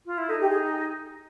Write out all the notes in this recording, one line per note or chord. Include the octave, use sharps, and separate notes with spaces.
F4
E4
D#4 A4
G4
G#4